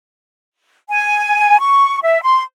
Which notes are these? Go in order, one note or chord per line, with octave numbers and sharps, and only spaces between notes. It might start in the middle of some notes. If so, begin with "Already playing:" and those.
G#5
C#6
E5
C6